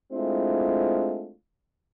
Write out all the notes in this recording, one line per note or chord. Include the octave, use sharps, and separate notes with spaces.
G#3 A3 C4 D4 E4 F4